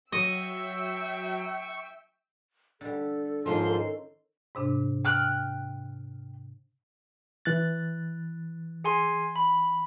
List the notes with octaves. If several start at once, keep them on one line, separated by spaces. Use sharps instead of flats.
F#3 D#5 E5 G5 C#6 E6
D3 G3 A4
G#2 D#3 F3 C#4 D#4 C6
G#2 C3 D4
G5 F6 F#6
E3 F#6 A6
G#4 G#5 C6
B5